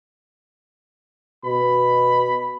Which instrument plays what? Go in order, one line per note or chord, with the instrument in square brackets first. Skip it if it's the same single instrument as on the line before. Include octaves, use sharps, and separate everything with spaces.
[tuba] B2 [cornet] B5